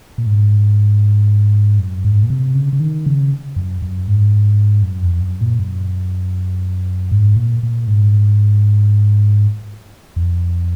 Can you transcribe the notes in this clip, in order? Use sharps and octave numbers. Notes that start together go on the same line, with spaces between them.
A#2
G#2
F#2
G#2
A#2
C3
C#3
C#3
D#3
C#3
F#2
F#2
G#2
F#2
F2
F#2
A#2
F#2
G#2
A#2
A#2
G#2
F2